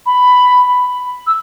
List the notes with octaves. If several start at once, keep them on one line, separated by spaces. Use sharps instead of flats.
B5
E6